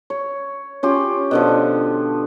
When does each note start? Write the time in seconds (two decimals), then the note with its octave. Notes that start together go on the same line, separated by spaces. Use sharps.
0.10 C#5
0.83 C#4 F4 G4
1.31 B2 D3 F3